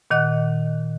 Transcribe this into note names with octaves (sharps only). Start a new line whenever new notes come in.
A#2 D#3 D#5 F#5 F#6